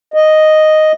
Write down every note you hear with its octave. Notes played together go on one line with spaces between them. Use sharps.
D#5